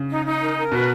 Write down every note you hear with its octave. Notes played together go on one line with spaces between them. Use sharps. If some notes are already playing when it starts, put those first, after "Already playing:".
Already playing: C#3
D#4
D#4
A#4
A#4
B2 B4